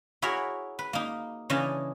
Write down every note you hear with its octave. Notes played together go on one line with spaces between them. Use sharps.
E4 F#4 G#4 A#4 C#5 E5
B4
A#3 D#4
C#3 E3 C#4 D4 D#5 A5